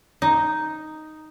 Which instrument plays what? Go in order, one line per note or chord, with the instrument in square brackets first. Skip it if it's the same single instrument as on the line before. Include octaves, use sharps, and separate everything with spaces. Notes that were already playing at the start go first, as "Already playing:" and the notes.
[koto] D#4